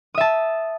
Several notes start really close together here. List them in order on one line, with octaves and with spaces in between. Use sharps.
D#6 E5 A5